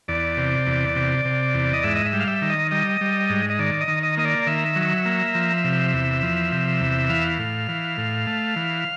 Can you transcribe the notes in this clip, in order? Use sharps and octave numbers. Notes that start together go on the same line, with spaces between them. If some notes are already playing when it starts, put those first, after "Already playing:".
E2 D5
C3
E2
C3
C3
E2
D#5
G#2 E5
D#5
E5
G3
F5
E5
D#3
D#5
G3 D#5
G3
G#2
D#5
D#3 D5
D#5
D#3
D#5
A#3 D#5
D5
D#3 E5
F#3
A#3
F3
C3
E2
F3
C3
E2
E3 F5
A2
E3
A2
A3
E3